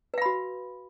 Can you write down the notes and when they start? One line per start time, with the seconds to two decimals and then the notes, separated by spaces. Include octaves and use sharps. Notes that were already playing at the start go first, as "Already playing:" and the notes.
0.14 B4
0.18 F5
0.22 B5
0.26 F#4